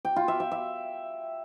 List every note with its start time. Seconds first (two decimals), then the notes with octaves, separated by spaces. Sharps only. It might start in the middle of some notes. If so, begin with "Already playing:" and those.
0.05 G5
0.16 F4
0.28 E5
0.40 E5
0.52 E5